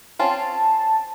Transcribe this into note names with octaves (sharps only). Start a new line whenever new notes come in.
C4 C#4 F4 A5